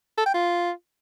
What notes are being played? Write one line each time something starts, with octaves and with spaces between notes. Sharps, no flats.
A4
G5
F4